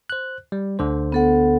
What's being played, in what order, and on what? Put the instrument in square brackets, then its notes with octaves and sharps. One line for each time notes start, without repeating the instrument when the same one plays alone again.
[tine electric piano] C5 F#6
G3
D2 D3 C5
[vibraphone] B3 A4 F#5